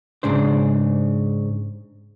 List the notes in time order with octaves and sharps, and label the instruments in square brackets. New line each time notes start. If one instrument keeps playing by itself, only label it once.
[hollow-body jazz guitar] G#2 C#3 D4 C5